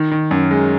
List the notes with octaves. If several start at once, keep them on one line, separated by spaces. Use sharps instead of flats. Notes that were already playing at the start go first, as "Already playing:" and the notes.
Already playing: D#3
D#3
F#2
G#3